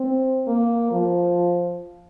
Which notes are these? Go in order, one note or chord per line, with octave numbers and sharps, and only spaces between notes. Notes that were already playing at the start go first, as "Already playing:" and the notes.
Already playing: C4
A#3
F3